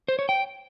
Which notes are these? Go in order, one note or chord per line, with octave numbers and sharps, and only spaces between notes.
C5
C#5
G5